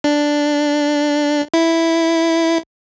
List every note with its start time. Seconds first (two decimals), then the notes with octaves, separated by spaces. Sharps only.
0.04 D4
1.54 E4